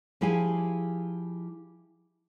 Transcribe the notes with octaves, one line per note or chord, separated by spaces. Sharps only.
F3 E4 G4 G#4 F5 G#5